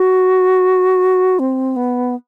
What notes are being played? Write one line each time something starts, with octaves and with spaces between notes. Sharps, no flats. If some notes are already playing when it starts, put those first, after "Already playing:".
Already playing: F#4
C4
B3